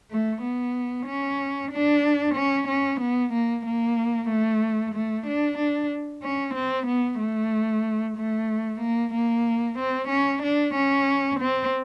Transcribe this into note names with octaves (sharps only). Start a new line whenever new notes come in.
A3
B3
C#4
D4
C#4
C#4
B3
A#3
A#3
A3
A3
D4
D4
C#4
C4
B3
A3
A3
A#3
A#3
C4
C#4
D4
C#4
C4